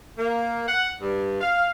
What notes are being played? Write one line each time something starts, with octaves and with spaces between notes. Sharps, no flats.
A#3
F#5
G2
F5